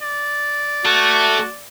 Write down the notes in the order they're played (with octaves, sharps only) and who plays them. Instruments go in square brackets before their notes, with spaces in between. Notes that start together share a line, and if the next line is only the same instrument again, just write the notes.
[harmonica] D5
[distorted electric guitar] A3 [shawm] F#4